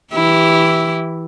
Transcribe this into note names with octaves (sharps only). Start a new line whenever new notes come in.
E3 E4 G4